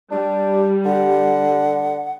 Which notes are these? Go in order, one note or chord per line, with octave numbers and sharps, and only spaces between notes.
G3 D4
D3 F#5